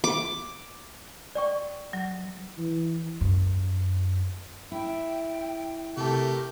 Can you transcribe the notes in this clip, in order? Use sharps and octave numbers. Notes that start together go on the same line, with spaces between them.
D6
D5 G5 C#6
F#3
E3
F#2
E4 G5
C3 A3 G4 A#4 E5 A5